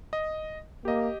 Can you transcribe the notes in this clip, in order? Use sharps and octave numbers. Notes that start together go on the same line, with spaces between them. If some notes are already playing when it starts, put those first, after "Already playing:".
D#5
A#3 G4 D#5